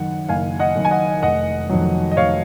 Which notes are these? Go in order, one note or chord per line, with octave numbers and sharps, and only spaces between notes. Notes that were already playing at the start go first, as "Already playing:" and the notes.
Already playing: F#1 F#2 D#3 F#5
F#1 F5 G#5
D#5 F#5
F#2 D#3
G#5
D#5 F#5
F1 D#5 F#5
F2 D#3 F#3
D#5
F1 C#5 F5